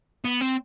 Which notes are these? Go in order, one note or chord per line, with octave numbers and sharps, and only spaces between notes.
B3
C4